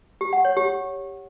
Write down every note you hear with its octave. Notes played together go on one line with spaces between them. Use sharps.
G4
F#5
C#5
G4